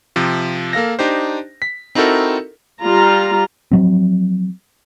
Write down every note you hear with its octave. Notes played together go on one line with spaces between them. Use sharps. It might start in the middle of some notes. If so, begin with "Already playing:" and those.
C3 F3
A#3 A4 F5 A#6
D4 D#4 G4 C5
B6
C4 D#4 E4 F#4 A4 A#4
G3 F4 A#5
F3 F#3 C4